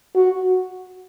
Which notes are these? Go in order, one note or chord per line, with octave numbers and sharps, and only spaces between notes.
F#4